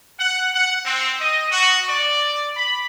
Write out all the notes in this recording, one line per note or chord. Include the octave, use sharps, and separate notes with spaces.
F#5
F#5
C4
D#5
F#4
D5
B5